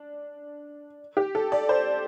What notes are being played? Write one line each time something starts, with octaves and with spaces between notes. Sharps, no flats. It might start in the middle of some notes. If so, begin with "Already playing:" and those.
Already playing: D4
G4
A4
D5
C5